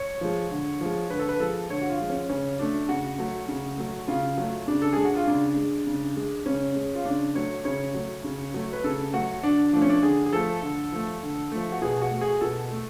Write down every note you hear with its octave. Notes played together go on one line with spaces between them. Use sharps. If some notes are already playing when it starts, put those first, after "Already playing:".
Already playing: C#5
F3 G#3
D3
F3 G#3
D3 B4
A4
B4
F3 G#3 A4
D3 C#5
F#4
F4
F3 G#3
C#4
C#3 C#4
F#3 A3 D4
C#3 F#4
F#3 A3
C#3
F#3 A3
C#3 F4
F#3 A3
C#3 D4
A4
G#3 G#4
F#4
F4
C#3 D4
G#3
C#3
G#3
C#3 C#4
G#3
F4
C#3 D4
F#3 A3 C#5
C#3 C#5
F#3 A3
C#3
F#3 A3
B4
C#3 A4
F#3 A3 F#4
D3 D4
F3 A3 D4
C#4
D4
D3 G#4
G#4
F3 A3 A4
D3
F3 A3
D3
F3 A3
F#4
B2 G#4
F#4
A3
G#4
B2 A4
A3